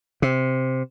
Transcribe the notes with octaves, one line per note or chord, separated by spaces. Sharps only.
C3